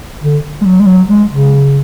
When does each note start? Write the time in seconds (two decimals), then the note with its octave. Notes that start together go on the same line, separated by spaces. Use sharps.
0.23 D3
0.62 G#3
0.65 F#3
0.80 G#3
0.87 F#3
1.08 G#3
1.30 C#3